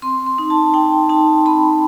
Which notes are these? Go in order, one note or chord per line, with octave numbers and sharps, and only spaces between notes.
C4 C6
C6
D#4
A5
D#4 G5
D#4 A5
C4 B5